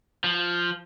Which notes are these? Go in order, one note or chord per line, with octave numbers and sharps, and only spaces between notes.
F3